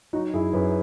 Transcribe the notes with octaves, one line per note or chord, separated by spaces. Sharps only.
F#3 D#4 F#4
F#2 E4 G#4
F#2 G#4 B4